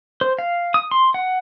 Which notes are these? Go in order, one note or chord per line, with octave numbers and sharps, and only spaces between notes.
C5
F5
D#6
C6
F#5